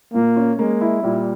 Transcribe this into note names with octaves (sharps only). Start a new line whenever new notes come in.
A#2 A#3
C#4
G#3 A#3
E4
A#2 G3